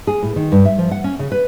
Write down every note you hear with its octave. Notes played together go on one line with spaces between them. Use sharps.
G#4
A2
D#3
G2
E5
F3
F#5
C#4
C#3
B4